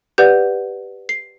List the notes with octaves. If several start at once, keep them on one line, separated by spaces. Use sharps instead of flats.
G4 B4 D5 F#5 G6
C7